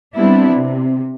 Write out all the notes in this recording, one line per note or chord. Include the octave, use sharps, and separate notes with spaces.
G3 B3 C4 D4 E4
C3